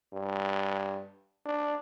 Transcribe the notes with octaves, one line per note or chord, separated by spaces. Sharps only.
G2
D4